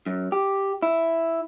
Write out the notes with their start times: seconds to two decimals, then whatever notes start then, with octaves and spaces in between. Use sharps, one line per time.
0.06 F#2
0.32 G4
0.83 E4